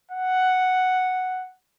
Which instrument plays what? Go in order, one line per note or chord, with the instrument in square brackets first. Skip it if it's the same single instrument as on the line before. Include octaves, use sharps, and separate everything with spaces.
[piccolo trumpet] F#5